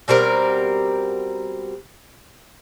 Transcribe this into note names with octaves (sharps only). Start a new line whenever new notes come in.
B2 G3 C4 A#4